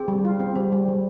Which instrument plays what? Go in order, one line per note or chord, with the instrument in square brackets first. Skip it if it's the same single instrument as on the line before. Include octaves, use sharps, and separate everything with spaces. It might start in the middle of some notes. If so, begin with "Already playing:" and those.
Already playing: [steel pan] C4 [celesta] G#4
[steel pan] G3
F4
C4
[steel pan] G3 [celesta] C5
[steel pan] G3
G3